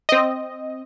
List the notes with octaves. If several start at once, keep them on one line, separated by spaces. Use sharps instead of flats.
C4 D#5